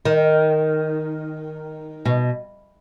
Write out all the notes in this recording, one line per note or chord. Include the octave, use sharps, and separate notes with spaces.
D#3
B2